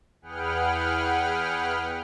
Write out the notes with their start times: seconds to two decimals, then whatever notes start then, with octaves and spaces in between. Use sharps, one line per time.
0.21 E2 G#4 B4 F#5 G5 F6